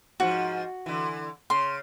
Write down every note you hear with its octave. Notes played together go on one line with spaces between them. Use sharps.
G#2 F3 F#4
D3 E3
C#3 C6